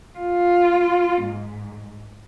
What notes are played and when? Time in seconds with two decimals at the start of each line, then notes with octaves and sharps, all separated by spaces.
0.19 F4
1.22 G#2